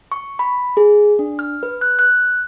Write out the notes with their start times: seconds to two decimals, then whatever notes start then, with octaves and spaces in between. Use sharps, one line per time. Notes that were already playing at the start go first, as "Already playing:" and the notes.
0.12 C#6
0.39 B5
0.77 G#4
1.19 D4
1.39 F6
1.63 B4
1.81 F#6
1.99 F#6